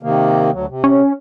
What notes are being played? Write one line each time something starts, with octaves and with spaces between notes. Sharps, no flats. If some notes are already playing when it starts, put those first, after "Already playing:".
C3 D#3 A#3
D2 F#3
C3
C#4